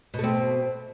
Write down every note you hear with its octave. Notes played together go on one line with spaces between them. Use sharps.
B2 A3 C4